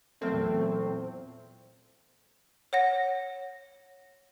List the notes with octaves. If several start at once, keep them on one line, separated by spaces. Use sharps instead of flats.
E2 A#2 F#3 A3 B3 C4 A#4
C#5 F#5 A#6